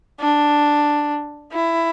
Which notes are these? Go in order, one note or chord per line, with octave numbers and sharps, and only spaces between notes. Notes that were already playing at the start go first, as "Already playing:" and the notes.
D4
E4